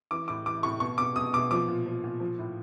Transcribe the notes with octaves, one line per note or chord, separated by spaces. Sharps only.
E3 D6
A2 D6
E3 D6
A2 C#6
B2 C#6
B2 D6
B2 D#6
B2 D6
F3 D6
A#2
F3
A#2
F3
A2